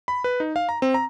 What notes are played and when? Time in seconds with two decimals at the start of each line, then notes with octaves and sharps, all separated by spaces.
0.08 B5
0.24 B4
0.40 D#4
0.56 F5
0.69 A#5
0.82 C4
0.94 A#5